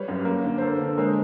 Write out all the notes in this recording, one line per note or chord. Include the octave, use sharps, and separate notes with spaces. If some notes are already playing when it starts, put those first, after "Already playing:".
Already playing: G3 B4 C#5
F#2
A#3
D3
C5
A#3 A4 B4
D3
G#3 A#4 C5